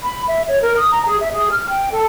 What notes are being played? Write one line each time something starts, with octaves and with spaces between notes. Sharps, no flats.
B5
E5
C#5
A#4
D#6
A#5
G#4
E5
G#4
F6
G5
A4